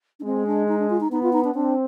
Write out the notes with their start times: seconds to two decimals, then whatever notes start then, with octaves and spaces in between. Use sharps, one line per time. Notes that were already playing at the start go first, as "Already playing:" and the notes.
0.20 D4
0.24 G#3 C4
0.47 D4
0.68 D#4
0.79 D4
0.90 F4
1.00 D#4
1.11 B3 D#4
1.23 F4
1.33 D#4
1.44 D4
1.54 C4 D4